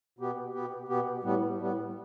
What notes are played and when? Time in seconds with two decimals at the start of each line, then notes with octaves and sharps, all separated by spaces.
0.19 B2 B3 G4
0.54 B2 B3 G4
0.88 B2 B3 G4
1.23 A2 G3 B3
1.58 A2 G3 B3